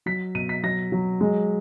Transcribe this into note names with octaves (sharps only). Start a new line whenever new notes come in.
F#3 B6
B2 D#7
B6
F#3 A#6
F#3
G#3